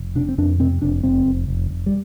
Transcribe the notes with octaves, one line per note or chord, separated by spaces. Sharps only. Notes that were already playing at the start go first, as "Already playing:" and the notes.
Already playing: F1
C3 D4
C4
F2 D4
C3 C4
F1 D4
F1 C4
F1
F1
F1
G3